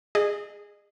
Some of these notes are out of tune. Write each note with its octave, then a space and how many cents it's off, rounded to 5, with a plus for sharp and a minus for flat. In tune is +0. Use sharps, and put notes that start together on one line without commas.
G#4 -15 D#5 -40